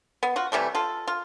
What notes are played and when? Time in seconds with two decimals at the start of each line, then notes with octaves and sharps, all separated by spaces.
0.23 B3
0.36 F4 F#4
0.52 C3 E3 G3 A3
0.75 F4 A4
1.08 F4